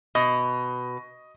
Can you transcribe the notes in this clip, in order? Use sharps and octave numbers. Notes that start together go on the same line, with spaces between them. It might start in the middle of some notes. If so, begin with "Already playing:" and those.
B2 D#5